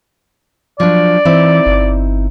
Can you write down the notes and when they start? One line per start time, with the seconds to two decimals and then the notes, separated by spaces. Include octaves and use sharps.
0.80 F3 F#3 D4 D5
1.25 E3 C4 D#4 E4
1.66 G1